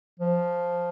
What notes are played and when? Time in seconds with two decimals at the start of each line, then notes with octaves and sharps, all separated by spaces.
0.19 F3